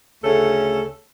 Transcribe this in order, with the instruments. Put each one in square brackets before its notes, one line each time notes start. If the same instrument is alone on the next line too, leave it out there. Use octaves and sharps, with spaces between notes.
[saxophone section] D2 C#3 A3 C#4 A4